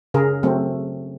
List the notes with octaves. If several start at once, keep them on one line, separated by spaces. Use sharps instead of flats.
C#3 G#4 A#4
F#3 A3 C4